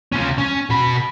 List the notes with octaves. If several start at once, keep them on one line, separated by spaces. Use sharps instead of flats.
C#4 F4
C#4
B2 B5